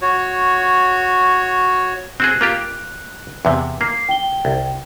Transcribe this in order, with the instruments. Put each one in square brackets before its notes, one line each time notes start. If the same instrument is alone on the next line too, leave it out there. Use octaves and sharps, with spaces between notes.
[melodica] F#4 C#5
[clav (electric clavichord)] C4 F#4 G#4 [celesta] F#6
[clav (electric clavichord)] A#3 F4 G4
E2 C3
[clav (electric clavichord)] A#3 [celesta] C7
[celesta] G5 G7
[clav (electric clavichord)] C2